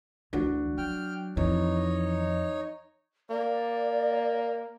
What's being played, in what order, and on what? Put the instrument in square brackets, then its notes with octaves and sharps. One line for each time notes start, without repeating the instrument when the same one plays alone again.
[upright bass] D2 E3 [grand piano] D4 F#4
[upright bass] F#3 [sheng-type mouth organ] G5 F6
[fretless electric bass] F2 [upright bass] E3 [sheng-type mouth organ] D#4 C#5
[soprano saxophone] A#3 [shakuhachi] D5